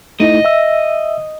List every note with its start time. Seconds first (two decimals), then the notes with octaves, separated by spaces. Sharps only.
0.20 A3 D#4 E4 D#5
0.45 E5 E6